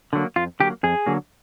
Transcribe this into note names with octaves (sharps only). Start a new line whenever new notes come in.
D3 F#3 A#3
F2 F4
D3 F#3 A#3 G4
F2 G#4
D3 F#3 A#3